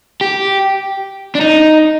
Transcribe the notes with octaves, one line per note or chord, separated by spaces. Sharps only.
G4
D4
D#4